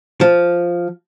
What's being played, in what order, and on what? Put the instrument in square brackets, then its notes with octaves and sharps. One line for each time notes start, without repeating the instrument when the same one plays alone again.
[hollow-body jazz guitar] F3